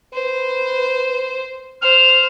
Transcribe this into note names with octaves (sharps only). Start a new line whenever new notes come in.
B4 C5
C5 F6